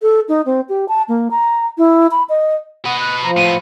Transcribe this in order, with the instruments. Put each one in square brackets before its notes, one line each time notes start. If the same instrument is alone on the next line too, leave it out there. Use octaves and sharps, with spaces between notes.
[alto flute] A4
D#4
C4
G4
A5
A#3
A#5
E4
B5
D#5
[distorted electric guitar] B4 D#5 [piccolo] F#5
[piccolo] F#6
[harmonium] F3 [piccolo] A#5
[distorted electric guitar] A2 B3 [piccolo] D#7